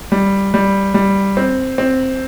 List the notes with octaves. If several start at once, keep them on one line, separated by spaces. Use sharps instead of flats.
G3
G3
G3
C4
C4